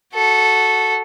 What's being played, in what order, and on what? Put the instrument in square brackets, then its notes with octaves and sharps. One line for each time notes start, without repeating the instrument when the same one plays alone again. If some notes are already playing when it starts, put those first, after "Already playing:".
[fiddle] F#4 A4